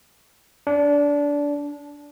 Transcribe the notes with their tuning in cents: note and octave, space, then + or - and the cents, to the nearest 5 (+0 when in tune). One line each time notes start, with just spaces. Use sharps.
D4 -20